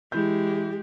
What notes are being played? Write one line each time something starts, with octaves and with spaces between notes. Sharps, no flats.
E3 G#3 E4 G4 G6